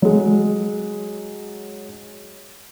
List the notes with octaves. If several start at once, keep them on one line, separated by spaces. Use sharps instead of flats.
F#3 G#3